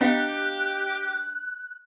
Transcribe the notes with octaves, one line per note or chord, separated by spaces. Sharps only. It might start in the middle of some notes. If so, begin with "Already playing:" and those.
B3 D4 G4 D#5 F5 F#6